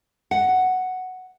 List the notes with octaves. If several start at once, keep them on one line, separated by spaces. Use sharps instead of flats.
F#5